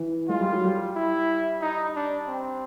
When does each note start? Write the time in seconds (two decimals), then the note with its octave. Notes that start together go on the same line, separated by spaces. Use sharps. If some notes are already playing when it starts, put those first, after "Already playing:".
Already playing: E3
0.28 G#3 F4
0.40 G3
0.52 F#3
0.64 G3
0.95 E4
1.62 D#4
1.95 D4
2.27 C4